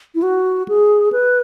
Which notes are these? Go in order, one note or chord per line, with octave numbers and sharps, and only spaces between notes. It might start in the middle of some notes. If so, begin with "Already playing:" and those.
E4
F#4
G#4
B4